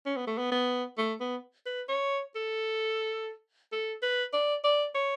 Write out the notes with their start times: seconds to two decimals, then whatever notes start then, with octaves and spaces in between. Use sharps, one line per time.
0.06 C#4
0.16 B3
0.27 A3
0.38 B3
0.52 B3
0.98 A3
1.20 B3
1.66 B4
1.89 C#5
2.36 A4
3.73 A4
4.03 B4
4.34 D5
4.64 D5
4.95 C#5